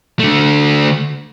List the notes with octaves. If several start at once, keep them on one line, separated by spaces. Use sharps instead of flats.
D3 A3